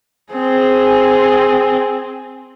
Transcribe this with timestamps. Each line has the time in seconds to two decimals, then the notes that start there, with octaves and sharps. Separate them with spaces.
0.33 C4 G#4